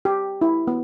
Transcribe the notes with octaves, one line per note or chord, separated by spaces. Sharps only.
G4
E4
B3